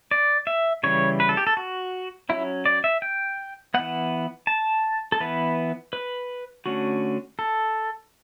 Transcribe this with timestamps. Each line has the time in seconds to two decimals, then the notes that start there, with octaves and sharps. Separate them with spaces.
0.11 D5
0.47 E5
0.83 C#3 E3 G3 C#5
1.20 B4
1.29 A4
1.37 G4
1.47 A4
1.57 F#4
2.29 F#3 C#4 E4
2.66 D5
2.84 E5
3.02 G5
3.74 E3 B3 F#5
4.47 A5
5.12 A4
5.20 E3 B3 B4
5.93 B4
6.66 D3 A3 C#4 F#4
7.39 A4